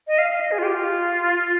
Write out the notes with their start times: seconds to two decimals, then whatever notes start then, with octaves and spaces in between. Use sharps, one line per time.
0.07 D#5
0.18 F5
0.30 F5
0.41 D#5
0.52 G#4
0.58 F4
0.63 G4
0.74 F4